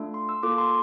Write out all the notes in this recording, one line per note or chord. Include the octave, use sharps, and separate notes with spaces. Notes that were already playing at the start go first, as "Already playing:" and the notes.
Already playing: A3 D4 F4 A4
C6
E6
A#3 F4 A4 D6
C6